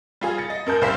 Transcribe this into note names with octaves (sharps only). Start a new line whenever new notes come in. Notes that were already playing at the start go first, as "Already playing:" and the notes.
G3 F4 G#4
A6 C#7
D#5
F#2 A#4 A5 G6
C2 G3 C4 C5 F5 B6